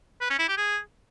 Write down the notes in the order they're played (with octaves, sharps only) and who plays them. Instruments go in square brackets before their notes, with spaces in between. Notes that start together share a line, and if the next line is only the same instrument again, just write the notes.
[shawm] B4
C#4
E4
G4
G#4